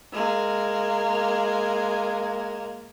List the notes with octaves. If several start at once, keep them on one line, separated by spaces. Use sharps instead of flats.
G#3 A#3